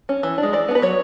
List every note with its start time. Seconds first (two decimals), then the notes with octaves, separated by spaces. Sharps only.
0.09 C#4
0.23 E3
0.38 D4
0.43 G#3
0.53 E3 D5
0.68 B3 D4
0.75 B4
0.82 F#3 C#5